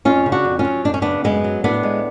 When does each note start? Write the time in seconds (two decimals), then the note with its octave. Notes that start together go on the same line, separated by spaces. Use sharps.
0.05 F2 C#4 F4
0.26 C#3
0.32 D4 F#4
0.45 F2
0.59 C#4 F4
0.65 F#3
0.85 F#2 D4
0.94 C#4
1.02 C#3 B3 D4
1.24 F#2 G#3 B3
1.44 F#3
1.64 A2 B3 D4
1.83 G#3